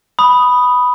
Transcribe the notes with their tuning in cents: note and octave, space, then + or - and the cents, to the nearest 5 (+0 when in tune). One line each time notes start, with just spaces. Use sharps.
B5 +0 D#6 +0